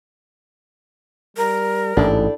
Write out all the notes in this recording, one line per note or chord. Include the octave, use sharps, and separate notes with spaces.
G3 A#4
A1 G#2 D4 E4 G4 A4